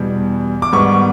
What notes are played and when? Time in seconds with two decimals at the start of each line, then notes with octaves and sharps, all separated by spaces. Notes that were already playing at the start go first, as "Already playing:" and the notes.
Already playing: E2 B2 G3
0.62 D6
0.72 G#2 D#3 G3 B3 C#6